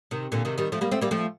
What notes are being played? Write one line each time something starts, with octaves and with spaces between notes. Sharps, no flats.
C3 D#3
A#2 D3
C3 D#3
D#3 G3
F3 A3
G3 A#3
A3 C4
G3 A#3
F3 A3